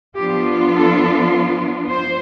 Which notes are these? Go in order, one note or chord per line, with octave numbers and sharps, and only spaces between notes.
F3 B3 D4 F4 G4
A4
C5